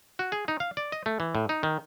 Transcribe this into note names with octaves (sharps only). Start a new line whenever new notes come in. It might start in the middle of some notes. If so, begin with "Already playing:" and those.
F#4
G#4
D#4
F5
D5
D#5
A3
E3
A2
D#4
D#3